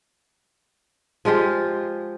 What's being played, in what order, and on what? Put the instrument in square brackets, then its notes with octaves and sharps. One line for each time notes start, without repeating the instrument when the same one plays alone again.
[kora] F3 G#3 F4 G4